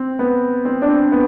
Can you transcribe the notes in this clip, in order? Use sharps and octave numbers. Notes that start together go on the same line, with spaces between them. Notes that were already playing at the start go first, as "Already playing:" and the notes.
Already playing: C4
B3
C4
D4
C4
B3